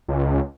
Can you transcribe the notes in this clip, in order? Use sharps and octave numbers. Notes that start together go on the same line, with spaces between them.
C#2